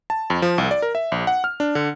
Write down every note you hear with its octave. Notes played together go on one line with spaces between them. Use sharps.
A5
F2
F3
C2
D5
A#4
E5
A#1
F#5
F6
D4
D3